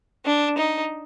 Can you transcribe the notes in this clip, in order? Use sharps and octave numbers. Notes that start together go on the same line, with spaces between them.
D4
D#4